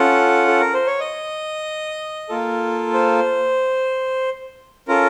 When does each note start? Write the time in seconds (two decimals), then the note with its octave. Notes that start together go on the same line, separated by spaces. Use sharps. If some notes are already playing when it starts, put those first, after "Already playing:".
Already playing: C#4 F4 A4 F#5
0.47 A4
0.61 A#4
0.74 C5
0.87 C#5
1.00 D#5
2.29 A#3 F4 A4
2.94 C5
4.88 C#4 F4 A4 A#4